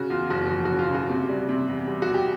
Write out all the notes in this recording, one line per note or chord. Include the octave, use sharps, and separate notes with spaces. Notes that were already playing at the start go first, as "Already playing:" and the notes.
Already playing: C#3 F#4
E2 F4
F#1 F#4
F3
C#3 F#4
F4
C#3
F#4
C3
G3
C3
E2
G3
F#4
E2
G4